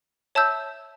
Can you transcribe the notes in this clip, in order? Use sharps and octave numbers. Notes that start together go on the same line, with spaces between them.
C#5 E5 A5 E6 G6